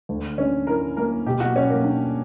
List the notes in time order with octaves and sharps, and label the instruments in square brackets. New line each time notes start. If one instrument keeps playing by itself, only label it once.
[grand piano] D2
[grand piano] D3 [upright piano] C#4
[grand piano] E4 [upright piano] A#4
[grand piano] A#3 [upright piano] A#4
[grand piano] B2 [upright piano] G4
[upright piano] F#4
[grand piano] B2 [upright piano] C#4
[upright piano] A#3
[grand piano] D4